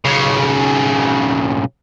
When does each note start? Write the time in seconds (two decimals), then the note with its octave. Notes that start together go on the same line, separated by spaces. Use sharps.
0.05 B1 C#3